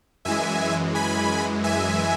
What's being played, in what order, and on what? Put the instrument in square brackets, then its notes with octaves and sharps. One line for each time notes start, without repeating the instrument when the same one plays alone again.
[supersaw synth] F#2 E3 G#3 E5 G#5
G#5 B5
E5 G#5